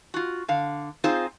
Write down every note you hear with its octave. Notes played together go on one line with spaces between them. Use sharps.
F4 F#4
D3 F5
C4 D#4 F4 G#4 C5